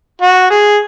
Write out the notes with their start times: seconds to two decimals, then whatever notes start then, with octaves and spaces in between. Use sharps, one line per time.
0.22 F#4
0.51 G#4